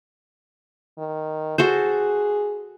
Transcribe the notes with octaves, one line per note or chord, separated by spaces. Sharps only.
D#3
F#4 G#4 A4 C5